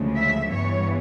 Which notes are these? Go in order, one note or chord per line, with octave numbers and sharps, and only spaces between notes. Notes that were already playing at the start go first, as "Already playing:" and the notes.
Already playing: D2 C#3 F3 G#3
E5
G2 E3 G3 B3 C#5